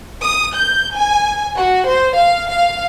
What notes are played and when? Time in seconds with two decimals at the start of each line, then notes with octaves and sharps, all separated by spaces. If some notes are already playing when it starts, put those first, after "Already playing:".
0.22 D#6
0.54 G6
0.96 G#5
1.56 F#4
1.87 C5
2.16 F5
2.50 F5